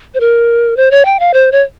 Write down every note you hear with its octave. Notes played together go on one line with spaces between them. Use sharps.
C5
A#4
C5
C#5
G5
F5
C5
C#5